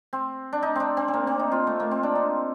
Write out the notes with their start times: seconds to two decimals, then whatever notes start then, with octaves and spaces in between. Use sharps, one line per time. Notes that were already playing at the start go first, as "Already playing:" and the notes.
0.13 C4
0.53 D4
0.63 D#4
0.75 C4 D4
0.97 C4
1.08 C4
1.14 A#3
1.27 C4
1.39 D#4
1.52 F4
1.67 A3
1.80 A#3
1.91 C4
2.03 D4
2.15 D#4